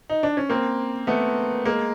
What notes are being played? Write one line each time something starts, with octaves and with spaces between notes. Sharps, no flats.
D#4
D4
C#4
A#3 C4
A3 B3
G#3 A#3